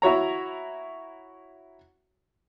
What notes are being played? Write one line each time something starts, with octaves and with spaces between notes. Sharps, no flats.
E4 F#4 C#5 A#5